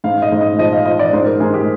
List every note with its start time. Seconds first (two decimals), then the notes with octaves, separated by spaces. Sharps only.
0.04 G#2 F5
0.22 D#5
0.32 G#2
0.41 D#5
0.58 F3 D#5
0.73 F5
0.85 F3 D#5
0.99 D5
1.13 G#2 C5
1.26 A#4
1.40 G#2 G#4
1.54 G4